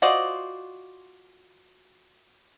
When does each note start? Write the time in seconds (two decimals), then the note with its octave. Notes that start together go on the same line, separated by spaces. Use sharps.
0.02 F4 F#4 C5 D5 D#5